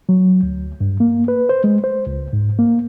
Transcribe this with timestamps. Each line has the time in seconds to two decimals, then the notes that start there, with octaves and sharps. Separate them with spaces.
0.09 F#3
0.43 D2
0.81 G2
1.00 A#3
1.28 B4
1.49 C5
1.64 G#3
1.84 C5
2.07 C#2
2.33 G#2
2.59 A#3